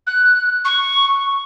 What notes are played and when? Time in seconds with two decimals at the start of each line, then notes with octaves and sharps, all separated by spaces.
0.07 F#6
0.65 C#6